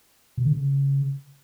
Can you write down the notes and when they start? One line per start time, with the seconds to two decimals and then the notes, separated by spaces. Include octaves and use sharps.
0.38 B2
0.45 D3
0.53 C#3